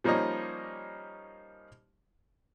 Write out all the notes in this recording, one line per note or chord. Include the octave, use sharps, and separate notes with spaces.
F3 G3 A#3 C#4 D#4 D#5